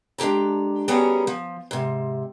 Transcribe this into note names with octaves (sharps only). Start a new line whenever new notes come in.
G#3 D4 G4 A4 A#5
G3 B3 C#4 F#4 G#4 A#4
F3
G#2 C3